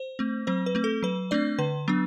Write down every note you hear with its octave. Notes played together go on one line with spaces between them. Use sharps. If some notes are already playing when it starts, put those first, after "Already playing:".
Already playing: C5
A3 C4
F#3 C4 C5
B4
A3 C4
A4
F#3 B4
A3 C4 D4 D5
D3 B4
F#3 B3 D4